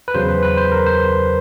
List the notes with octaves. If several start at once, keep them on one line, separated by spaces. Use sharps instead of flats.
B4
E2 C#3 F#3 C5
B4
B4
C5
A#4
C5